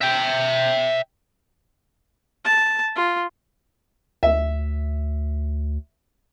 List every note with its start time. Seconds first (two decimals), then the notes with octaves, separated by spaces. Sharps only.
0.02 E5 G5
2.45 A5
2.95 F4
4.23 D2 E5